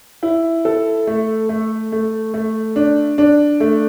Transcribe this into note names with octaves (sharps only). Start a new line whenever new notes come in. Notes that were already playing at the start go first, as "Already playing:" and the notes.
E4
A4
A3
A3
A3
A3
D4
D4
A3